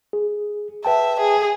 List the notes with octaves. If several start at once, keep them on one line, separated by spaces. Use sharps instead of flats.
G#4
B4 E5 G5 A5
G#4